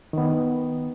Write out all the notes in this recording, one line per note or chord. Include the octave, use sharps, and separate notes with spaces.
D#3 B3